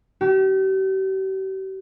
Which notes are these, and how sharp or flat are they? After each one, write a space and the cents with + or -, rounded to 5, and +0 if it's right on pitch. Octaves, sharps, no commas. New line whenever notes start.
G4 -40